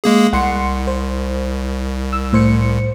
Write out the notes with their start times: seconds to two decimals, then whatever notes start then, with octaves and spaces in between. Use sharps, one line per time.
0.04 G#3 A#3 G#4
0.33 C2 F#5 C6 C#7
0.87 C5
2.13 E6
2.33 A2 C5 C#7